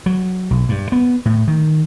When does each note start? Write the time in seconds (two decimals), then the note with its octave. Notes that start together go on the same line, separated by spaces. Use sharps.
0.06 F#3
0.51 B1
0.69 G2
0.92 B3
1.26 A2
1.48 D#3